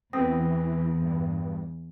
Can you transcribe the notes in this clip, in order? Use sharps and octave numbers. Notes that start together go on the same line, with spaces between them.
E2 E3 B3 C4 D#6 A#6
G2